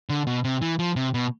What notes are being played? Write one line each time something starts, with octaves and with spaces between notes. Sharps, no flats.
D3
B2
C3
E3
F3
C3
B2